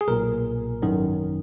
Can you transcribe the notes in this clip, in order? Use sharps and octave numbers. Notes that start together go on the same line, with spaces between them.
G#4
B1 A#2 A#4
G#1 F#2 D#3